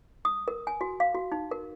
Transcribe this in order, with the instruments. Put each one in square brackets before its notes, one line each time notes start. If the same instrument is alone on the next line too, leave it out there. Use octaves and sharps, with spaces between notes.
[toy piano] D#6
A#4
G#5
F#4
F5
F#4
D#4
A#4